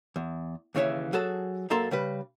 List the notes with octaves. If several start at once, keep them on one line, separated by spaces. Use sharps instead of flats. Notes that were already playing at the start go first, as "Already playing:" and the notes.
E2
D#2 C#3 E3 C#5 E5
F#3 F#4 G#4 A4 A5
F#2 A#3 A4 A#5 C6
C#3 G3 B4